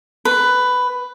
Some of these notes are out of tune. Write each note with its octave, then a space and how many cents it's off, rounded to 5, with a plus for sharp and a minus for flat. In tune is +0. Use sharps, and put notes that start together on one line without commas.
B4 +10